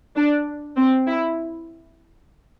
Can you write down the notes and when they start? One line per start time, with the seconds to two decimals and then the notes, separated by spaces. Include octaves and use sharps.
0.16 D4
0.77 C4
1.07 E4